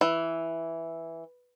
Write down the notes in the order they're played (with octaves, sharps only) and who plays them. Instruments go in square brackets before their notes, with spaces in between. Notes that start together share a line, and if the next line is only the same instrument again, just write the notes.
[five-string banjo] E3